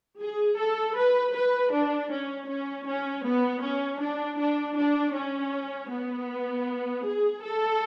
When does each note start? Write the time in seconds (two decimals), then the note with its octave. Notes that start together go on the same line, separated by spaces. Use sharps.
0.20 G#4
0.58 A4
0.96 B4
1.34 B4
1.72 D4
2.11 C#4
2.48 C#4
2.87 C#4
3.25 B3
3.63 C#4
4.00 D4
4.38 D4
4.76 D4
5.14 C#4
5.90 B3
7.05 G#4
7.43 A4